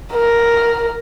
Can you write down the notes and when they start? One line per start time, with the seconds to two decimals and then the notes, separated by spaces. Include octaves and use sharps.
0.13 A#4